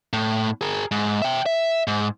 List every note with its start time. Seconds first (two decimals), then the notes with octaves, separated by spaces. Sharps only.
0.13 A2
0.61 G#4 A#4
0.91 G#2
1.22 E5 G5
1.46 E5
1.87 G#2